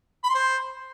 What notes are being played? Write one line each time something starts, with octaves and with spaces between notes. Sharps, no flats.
B5
C6
C5